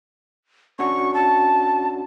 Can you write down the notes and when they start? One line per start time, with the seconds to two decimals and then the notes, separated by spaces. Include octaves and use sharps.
0.79 C#4 D4 F#4 C#6
1.14 A5